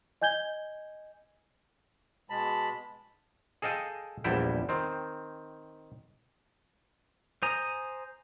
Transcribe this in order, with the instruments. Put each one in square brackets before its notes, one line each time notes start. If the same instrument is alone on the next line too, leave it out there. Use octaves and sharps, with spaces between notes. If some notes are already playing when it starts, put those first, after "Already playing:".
[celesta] D#5 G#5 G6 G#6 G7
[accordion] B2 G#3 B5 [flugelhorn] A5
[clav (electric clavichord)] G#4 A4 D#5 F5 G5
A#1 E2 G3 E4 E5 G5
D#3 C4
[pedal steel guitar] C5 G#5 A#5 D#6